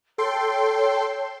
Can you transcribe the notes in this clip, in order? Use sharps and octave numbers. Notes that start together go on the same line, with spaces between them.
A4 C#5 G5 C6